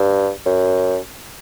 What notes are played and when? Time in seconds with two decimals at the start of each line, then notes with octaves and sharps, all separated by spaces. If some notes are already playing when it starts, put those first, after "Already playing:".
Already playing: G2
0.46 F#2